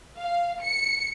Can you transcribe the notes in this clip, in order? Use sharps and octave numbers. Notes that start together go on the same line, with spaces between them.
F5
C#7